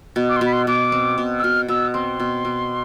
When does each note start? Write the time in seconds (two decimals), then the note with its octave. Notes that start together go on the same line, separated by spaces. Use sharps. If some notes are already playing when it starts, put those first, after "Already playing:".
0.16 B2
0.29 D6
0.37 C6
0.41 B2 B5
0.53 C6
0.67 B2 D6
0.92 C4
1.18 B2
1.39 E6
1.43 B2 F6
1.68 B2 E6
1.94 C4 C6
2.20 B2
2.45 B2